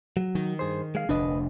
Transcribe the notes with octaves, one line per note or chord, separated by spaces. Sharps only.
F#3
D#3
G2 G#4 C5
G#3 F5
F1 D2 D4 B4 D#5